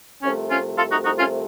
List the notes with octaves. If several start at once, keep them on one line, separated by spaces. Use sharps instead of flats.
C2 C3 F3 A3 C#4
C#4 F4
F4 A4
D#4 F#4
D#4 F#4
C#4 F4